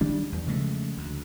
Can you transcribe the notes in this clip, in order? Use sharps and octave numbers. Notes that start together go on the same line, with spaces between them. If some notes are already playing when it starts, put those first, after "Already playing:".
D#3 G3 D4
E2
C#3 F3 G#3 A3
D2